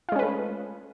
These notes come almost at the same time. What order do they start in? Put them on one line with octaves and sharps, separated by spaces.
F4 G#3 C#4 B4 A3